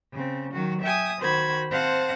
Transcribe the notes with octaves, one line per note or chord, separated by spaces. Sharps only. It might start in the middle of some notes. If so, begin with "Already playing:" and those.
C#3 C4
D#3 F#3 F#4
E5 G5 G#5 D#6
D#3 F#4 C5 B5 G#6
C4 C5 F5 F#5 A5 A#6